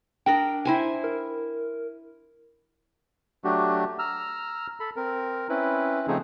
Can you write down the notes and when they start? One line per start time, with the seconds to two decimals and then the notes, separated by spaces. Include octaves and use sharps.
0.26 D4 A#4 D#5 G5
0.65 E4 C5 G#5
1.04 A#4
3.44 F#3 A3 D4 F#4 G4
3.99 A#5 E6 F6
4.80 A4 B5
4.96 C4 A#4
5.49 C4 C#4 E4 B4
6.08 C#3 F3 A3 C4 D#4 G#4